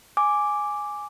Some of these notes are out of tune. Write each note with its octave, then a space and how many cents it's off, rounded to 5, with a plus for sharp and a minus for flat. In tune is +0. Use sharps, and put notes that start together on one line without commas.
G#5 +0 D6 +0